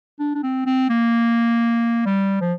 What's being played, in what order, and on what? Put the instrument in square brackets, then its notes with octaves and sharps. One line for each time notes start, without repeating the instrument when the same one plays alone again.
[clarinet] D4
D4
C4
C4
A#3
G3
F3